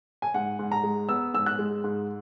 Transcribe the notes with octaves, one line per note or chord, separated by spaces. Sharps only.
G#5
G#2 F#5
G#2
A#5
G#3
B3 E6
G#2 E6
F#6
G#3
G#2